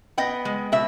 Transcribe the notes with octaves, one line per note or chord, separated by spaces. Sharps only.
B3 D#5 G5
G#3
B2 E5